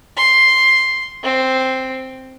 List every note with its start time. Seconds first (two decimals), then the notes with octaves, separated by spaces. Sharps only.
0.17 C6
1.24 C4